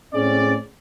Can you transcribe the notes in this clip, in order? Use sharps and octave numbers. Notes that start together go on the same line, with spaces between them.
A2 G#3 C4 C#4 G#4 D5